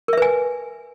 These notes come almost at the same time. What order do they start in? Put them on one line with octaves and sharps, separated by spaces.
A#4 E5 B4 G#5